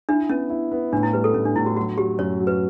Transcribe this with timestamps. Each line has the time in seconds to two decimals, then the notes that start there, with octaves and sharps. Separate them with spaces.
0.09 D4 E4
0.29 B3 C#4
0.50 E4
0.71 B3
0.93 A2 D4
1.03 E4
1.13 G3 B4
1.24 A4
1.34 A2 C#4
1.45 D4
1.56 A2 E4
1.66 F#4
1.76 F#3 F#4
1.97 F#3 G4
2.19 F#2 C#5
2.40 F#3
2.47 B4